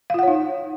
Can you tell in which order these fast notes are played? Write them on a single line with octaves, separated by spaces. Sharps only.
F5 F4 F#5 C#5 D#4